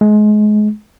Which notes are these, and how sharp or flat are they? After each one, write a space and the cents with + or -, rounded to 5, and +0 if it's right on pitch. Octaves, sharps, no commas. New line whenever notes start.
G#3 +30